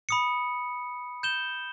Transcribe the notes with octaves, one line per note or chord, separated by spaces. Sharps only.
B5 D#6 C#7
G6 E7 G7